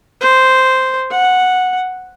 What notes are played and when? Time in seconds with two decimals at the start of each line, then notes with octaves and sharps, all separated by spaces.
0.21 C5
1.11 F#5